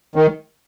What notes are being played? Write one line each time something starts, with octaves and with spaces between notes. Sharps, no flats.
D#3